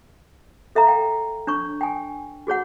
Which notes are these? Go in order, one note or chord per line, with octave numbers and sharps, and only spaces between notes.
A4 E5 F5 A#5
F5 G5
D4 C#5 C#6
G5 G#5
F#4 G#4 C#5 F#5